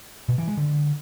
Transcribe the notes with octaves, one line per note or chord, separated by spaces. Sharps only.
B2
E3
G#3
D3